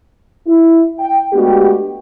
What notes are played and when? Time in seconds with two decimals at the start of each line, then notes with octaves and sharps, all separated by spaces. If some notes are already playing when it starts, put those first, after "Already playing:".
0.47 E4
0.99 G5
1.33 G#3 A3 B3 D4 F#4 G4